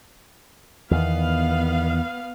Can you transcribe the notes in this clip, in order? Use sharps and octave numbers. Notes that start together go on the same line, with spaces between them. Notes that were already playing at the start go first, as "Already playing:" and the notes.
E2 D#3 B3 F5